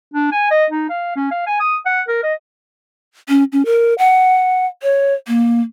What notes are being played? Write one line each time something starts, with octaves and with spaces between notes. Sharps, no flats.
D4
G#5
D#5
D#4
F5
C#4
F5
G#5
D#6
F#5
A#4
D#5
C#4
C#4
A#4
F#5
C#5
A#3